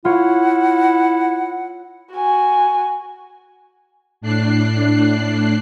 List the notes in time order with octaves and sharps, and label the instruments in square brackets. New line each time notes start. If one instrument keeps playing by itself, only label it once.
[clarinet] E4 [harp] F4 C#5 [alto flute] F#5
[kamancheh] F#4 G#5
[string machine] A2 D4 F#6 C7